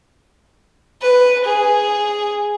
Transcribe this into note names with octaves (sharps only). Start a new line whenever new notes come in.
B4
G#4